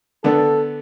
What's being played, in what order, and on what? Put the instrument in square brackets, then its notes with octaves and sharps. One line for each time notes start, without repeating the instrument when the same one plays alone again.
[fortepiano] D3 B3 D4 [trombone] A4